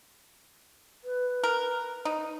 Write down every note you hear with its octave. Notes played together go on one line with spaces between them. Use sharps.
B4
A#4
D#4